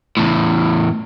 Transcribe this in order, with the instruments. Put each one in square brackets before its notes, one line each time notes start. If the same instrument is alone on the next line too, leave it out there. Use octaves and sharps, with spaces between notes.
[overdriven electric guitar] E2 A2